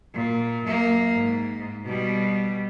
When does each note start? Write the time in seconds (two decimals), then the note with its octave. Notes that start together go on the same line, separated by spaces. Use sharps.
0.15 A#2
0.66 F#2 A#3
1.12 G#2
1.85 B2 G3